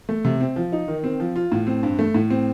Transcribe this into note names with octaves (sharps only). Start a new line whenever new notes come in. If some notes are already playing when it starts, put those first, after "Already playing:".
A3
C3
C4
F3
D#4
D#3
C4
F3
F4
A2
C4
G2
A3
A2
C4